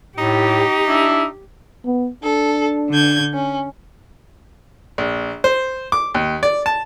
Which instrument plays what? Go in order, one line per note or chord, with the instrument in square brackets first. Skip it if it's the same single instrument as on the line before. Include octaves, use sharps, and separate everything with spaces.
[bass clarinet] A2 [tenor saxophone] D#4 [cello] G4
[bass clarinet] D4 [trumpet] E4
[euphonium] B3
[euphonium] D4 [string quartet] A4
[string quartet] D3 G6 G#6
C#4
[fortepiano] A#1
C5
D6
D#2
D5
A5